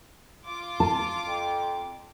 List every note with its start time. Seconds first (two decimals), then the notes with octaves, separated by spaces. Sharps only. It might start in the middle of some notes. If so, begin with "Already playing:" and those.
0.46 F4 C6 D6
0.80 A5
1.23 F2